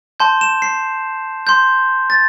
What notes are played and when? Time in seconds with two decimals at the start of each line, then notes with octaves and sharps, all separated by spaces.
0.20 A5 C6 G6
0.41 E7
0.62 C7
1.47 C6 G6
2.10 A6